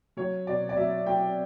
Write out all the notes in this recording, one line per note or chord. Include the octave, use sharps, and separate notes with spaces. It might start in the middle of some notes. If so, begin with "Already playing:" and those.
F#3 C#5
B2 D5
D5
F#3 E5
F#3 G5